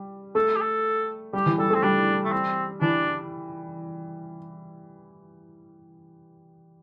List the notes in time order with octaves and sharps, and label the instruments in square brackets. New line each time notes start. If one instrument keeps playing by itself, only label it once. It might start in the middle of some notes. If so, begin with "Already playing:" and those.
Already playing: [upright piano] G3
[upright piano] A3 [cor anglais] A4
[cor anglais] G4
A4
[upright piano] G3 [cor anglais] G4
[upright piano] E3
[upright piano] G3 [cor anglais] A4
[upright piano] A3 [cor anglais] C4
[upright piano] G3 [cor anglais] D4
[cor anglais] A3
C4
[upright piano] E3 [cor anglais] D4